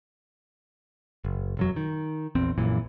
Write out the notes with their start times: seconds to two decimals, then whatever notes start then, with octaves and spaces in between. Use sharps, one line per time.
1.25 F#1
1.57 E1 F#2 F#3
1.76 D#3
2.35 A#1 E2 C4
2.58 A#1 F#2 A#2 E3